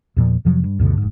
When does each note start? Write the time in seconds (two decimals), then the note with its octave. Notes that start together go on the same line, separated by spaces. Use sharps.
0.16 E2 A#2 F3
0.45 F2 C3 F3 F#3
0.64 G2
0.79 D2 G2 B2 D3
0.98 F1 G#2